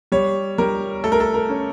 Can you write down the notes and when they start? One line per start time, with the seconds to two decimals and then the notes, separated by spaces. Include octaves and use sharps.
0.12 G3 C#5
0.58 G3 A#4
1.04 A3 A4
1.12 A#4
1.20 A4
1.34 A#4
1.49 C#4